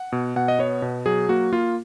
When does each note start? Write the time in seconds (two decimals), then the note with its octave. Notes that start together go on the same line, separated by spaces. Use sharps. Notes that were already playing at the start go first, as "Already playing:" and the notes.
Already playing: F#5
0.12 B2
0.36 B2 F#5
0.48 D#5
0.59 B3 C#5
0.82 B2
1.06 F#3 G#4
1.29 A#3 F#4
1.52 A#3 F4